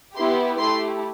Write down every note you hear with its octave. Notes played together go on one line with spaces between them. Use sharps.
B3 E4 G4 C6
A3 E4 G4 C6